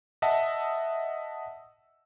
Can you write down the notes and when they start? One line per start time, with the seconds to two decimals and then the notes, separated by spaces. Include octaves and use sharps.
0.22 D#5 E5 F#5 A5 E6